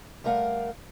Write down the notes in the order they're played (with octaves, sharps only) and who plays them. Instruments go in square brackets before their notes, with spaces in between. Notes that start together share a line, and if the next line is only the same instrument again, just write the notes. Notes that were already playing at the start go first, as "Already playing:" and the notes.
[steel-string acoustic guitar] G3 A3 A#4 F5 F#5